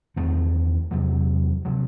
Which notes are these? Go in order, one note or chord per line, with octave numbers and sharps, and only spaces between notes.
E2 D#3 A3 C4
E2 C3 F#3
C3 F#3